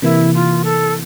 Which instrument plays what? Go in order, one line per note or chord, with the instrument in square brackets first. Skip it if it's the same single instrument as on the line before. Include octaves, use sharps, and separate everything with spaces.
[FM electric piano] C3 E3 A#3 [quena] E4
[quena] F4
A4